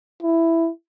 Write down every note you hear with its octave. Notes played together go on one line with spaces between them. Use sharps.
E4